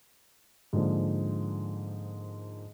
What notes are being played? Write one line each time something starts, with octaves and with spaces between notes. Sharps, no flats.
G#2 D3 F3 A#3